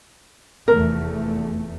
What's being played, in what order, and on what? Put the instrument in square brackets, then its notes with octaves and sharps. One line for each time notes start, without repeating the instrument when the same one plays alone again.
[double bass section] F1 E2 A3 [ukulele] A#4